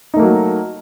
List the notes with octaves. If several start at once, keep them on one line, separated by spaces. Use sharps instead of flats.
F#3 A3 A#3 D#4